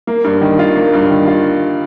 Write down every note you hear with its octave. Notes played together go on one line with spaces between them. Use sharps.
A#3
G2
D#3
F4
A#3
G2
D#3
F4